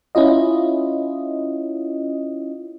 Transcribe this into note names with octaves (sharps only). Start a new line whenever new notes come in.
C#4 E4 F4 D#5